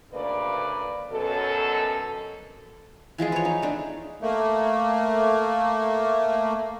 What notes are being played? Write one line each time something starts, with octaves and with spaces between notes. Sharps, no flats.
D2 C#3 A#3 B4 D5
F#2 B2 A4
E3 F3 G#3 G#4
B4 C#5
D#4
A3 D4
A3 A#3